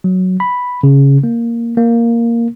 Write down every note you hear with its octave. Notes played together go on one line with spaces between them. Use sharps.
F#3
B5
C#3
A#3
A#3